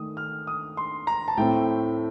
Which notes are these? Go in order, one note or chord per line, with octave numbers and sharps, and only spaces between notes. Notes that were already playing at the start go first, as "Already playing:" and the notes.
Already playing: D#3 A3 D4 D#6
F6
D#6
C6
A#5
A5
A2 A3 C4 G5